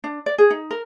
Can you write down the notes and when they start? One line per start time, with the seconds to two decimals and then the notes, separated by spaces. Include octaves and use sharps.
0.04 D4
0.26 D5
0.38 G#4
0.50 D#4
0.71 A#4